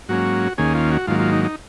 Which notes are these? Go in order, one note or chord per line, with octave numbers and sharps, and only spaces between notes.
G#2 F#3 A#3 C#4 F#4
D#2 D#3 A#3 C#4 G#4
F4
F#4
G#2 D#3 F#3 A#3 F4
F4
D#4
D#4